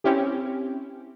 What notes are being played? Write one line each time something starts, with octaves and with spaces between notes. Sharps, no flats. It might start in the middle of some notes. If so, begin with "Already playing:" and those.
C4 C#4 E4 G4